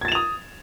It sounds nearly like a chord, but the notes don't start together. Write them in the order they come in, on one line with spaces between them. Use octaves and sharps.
G#6 A6 E7 F7 D#6